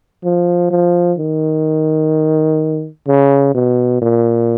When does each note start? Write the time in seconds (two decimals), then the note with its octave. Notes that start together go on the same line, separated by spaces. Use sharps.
0.24 F3
0.71 F3
1.19 D#3
3.08 C#3
3.55 B2
4.02 A#2